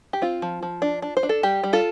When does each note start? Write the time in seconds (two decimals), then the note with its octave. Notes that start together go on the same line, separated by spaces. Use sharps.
0.13 G4
0.22 C4 F4
0.42 F3
0.63 F3
0.82 D4
1.02 D4
1.17 C5
1.23 D4
1.29 A4
1.43 G3 G4
1.64 G3
1.73 F4 A4